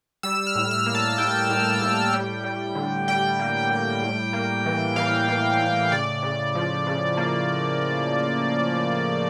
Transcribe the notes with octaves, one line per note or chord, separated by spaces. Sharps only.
G3 E6
F6
A2
F6
A#3
A5
A2 G5
A2
A2
G3
G3
D3
G3 G5
A#3
G3
A2
A#3
E3
E3 F5
E3
A2
C#3 D5
C#3
F3
C#3
A#3